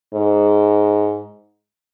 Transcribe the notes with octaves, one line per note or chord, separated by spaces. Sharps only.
G#2